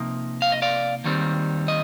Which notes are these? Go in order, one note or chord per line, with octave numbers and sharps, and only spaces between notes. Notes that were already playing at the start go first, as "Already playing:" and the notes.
Already playing: C3 F3 A#3 D#4
F5
D#5
D5 F5
D#2 D#3 G3 C4
D#5